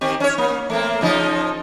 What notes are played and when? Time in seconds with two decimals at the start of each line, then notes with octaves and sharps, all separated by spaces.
0.01 D#3 C4 G4
0.20 C#4 C#5
0.38 A#3
0.70 A3 A#3 C4
1.01 C#3 F3 D#4